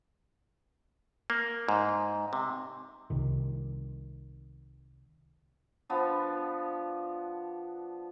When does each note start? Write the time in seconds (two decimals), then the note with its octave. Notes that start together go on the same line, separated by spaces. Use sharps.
1.30 A#3
1.69 G#2
2.33 C3
3.10 C2 C3 D#3
5.89 F3 B3 D4